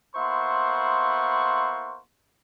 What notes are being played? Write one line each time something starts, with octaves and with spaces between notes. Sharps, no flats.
A#3 B3 E4 C5 C6 C#6